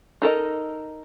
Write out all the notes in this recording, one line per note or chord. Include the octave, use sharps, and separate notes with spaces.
D#4 A4 A#4 D#5